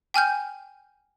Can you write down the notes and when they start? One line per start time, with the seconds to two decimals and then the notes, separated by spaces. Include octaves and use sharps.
0.14 G5 G#5 F6 G6